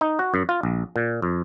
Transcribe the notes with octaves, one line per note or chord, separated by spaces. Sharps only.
D#4
F#4
F#2
F4
A#1
A#2
F2